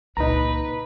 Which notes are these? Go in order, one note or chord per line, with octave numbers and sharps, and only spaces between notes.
C#2 A#2 D#4 B4 A#5